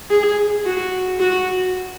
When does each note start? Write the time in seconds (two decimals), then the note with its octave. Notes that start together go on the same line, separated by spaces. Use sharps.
0.10 G#4
0.66 F#4
1.20 F#4